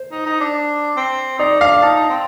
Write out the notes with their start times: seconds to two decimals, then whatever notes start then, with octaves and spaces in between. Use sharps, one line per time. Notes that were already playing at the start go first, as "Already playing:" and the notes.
Already playing: C5
0.12 D#4
0.26 D#4
0.40 D4
0.97 C4
1.39 D#4 D5
1.60 D4 F5
1.82 D#4 A5
1.96 D#4
2.10 C4